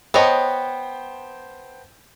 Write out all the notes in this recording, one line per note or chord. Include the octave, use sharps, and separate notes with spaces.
B3 C5 C#5 D#5 G5 A5